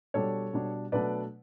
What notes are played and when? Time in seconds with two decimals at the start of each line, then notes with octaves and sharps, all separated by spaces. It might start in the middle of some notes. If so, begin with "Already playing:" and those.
0.14 B2 G3 D4 A4 C#5
0.53 B2 G3 D4
0.92 B2 F#3 A3 D4 B4 D5